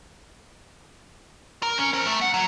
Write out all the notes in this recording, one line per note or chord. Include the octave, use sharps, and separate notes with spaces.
A#4
C#4
A#4 C5
A3
F#5
F#3